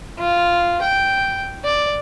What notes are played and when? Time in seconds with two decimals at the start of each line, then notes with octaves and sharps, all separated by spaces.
0.19 F4
0.82 G5
1.65 D5